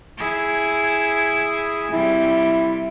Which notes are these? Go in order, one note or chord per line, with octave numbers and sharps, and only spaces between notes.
E4 G#4
C3 G3 E4